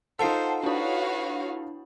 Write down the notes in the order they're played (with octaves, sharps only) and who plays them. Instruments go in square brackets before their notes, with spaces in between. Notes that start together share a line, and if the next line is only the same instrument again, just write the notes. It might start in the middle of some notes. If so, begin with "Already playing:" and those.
[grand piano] D#4 F4 A4 [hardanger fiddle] C5 [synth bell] F#5 A5 C7
[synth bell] D4 E4 [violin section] F#4 C#5 F5 [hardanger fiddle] B4